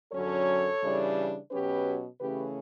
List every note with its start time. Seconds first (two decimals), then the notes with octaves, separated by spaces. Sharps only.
0.12 F#2 D3 F#3 C#4 A4 C#5
0.82 C#3 E3 G3 D4
1.51 B2 F#3 C#4 G4 B4
2.19 C#3 E3 A3 C#4 G4 B4